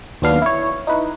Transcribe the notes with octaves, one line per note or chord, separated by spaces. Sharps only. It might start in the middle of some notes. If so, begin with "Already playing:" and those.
D#2 F#3 B3 D4 F5
E4 C#5
D#4 E4 B4